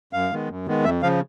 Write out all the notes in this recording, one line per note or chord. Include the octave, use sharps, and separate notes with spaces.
F#2 F5
D#3 G#3 B3
F#2
D#3 G#3 B3
F2 E5
C#3 F3 F5